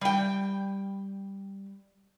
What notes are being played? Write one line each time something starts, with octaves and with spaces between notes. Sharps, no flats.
G3 G5